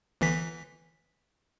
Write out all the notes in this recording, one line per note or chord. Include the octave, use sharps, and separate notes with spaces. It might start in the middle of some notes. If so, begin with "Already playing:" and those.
G1 E3 B6